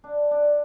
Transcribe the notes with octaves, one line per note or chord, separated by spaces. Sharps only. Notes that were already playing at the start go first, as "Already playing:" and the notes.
D4
D4